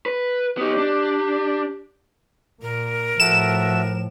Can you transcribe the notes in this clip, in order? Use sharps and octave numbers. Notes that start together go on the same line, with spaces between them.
B4
B3 D#4 G4
D4
A#2 A#4
A2 F3 F#4 A4 E5 E7